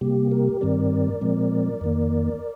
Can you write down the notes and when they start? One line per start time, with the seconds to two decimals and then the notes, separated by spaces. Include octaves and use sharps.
0.01 C3 G3 A#3 G4
0.31 G4 A#4
0.61 G2 D#3 G3 C4 A#4 D5
1.21 A#2 F3 G#3 C4
1.81 F2 D#3 A#3